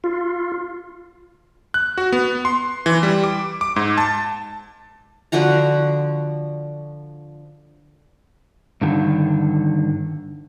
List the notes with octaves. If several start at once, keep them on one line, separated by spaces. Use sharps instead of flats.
F4
F#6
F#4
B3
C6
E3
G3
D6
D6
G#2
A5
D3 F3 F#4 A#5
G2 D3 D#3